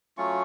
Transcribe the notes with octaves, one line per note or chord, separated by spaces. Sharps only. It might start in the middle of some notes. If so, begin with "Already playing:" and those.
F#3 A3 C#4 F4 C#6